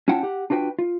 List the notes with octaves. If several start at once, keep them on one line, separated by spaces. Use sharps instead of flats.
C#4 E4 F4 F#5 G5 A5
G4 F#5
D4 F4 F#4 B4 G5
F4